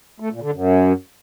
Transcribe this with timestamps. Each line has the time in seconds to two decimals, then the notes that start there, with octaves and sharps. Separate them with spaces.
0.20 A3
0.31 A#2
0.42 D3
0.53 F#2